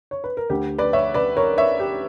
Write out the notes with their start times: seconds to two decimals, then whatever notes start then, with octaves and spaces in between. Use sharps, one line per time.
0.11 C#5
0.24 B4
0.37 A#4
0.50 D2 D3 G4
0.78 B4 D5
0.93 C#5 E5
1.14 B4 D5
1.37 A#4 C#5
1.58 C#5 E5
1.80 G4